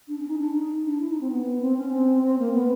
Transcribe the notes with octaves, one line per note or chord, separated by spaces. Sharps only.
D4
C#4
D#4
D4
D#4
D4
E4
D#4
C4
B3
C4
C#4
C4
C4
A#3
B3